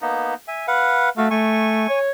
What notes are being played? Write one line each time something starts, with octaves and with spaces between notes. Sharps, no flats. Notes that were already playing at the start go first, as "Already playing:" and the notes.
A#3 B3 D#4
E5 G#5
B4 F5 F#5
A3 F#4 F5
A3 G#5 C#6
C#5